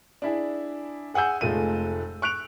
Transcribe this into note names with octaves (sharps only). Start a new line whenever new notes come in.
D4 E4 G#4
G#4 F#5 G#5 E6 G6
F1 G#3 A3 F4 D#7
C#6 F#6 D7 F7